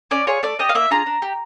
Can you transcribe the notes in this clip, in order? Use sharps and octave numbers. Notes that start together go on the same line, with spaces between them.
C#4 D5
F4 G#4 C#5
A3 D5
D4 G4 D#5
F5
A#3 E5
D4 F4 G#4 A#5
D4
G4